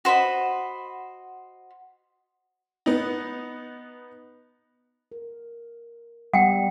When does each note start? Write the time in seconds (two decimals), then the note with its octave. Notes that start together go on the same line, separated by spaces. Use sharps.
0.05 F#4 C5 D#5 B5
2.86 B3 D#4
5.12 A#4
6.34 G3 B3 F#5 G5